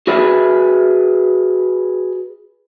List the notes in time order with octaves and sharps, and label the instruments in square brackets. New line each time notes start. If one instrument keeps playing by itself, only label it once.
[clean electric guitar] F#4 G#4 B4 D5 E5